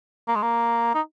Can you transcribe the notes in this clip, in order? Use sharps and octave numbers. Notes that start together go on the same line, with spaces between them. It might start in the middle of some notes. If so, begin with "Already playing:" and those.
A#3
G#3
A#3
D#4